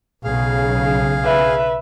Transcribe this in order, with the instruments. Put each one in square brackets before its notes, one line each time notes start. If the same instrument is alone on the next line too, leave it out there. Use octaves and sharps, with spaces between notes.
[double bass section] B1 C#3 [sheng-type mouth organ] G#4 F5
[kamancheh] B4 E5